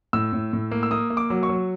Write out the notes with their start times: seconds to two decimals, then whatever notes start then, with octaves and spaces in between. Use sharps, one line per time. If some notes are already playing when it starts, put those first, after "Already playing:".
0.13 A2 E6
0.33 A2
0.53 A2
0.71 A#3
0.83 E6
0.91 A#3 D#6
1.10 A#3
1.17 D6
1.30 F#3
1.43 C#6
1.49 F#3